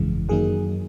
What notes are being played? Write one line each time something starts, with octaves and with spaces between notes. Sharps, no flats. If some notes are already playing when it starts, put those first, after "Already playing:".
Already playing: G1 F2 C#3 E3 G#3
F#2 D#3 F#3 A#3 D#4 G#4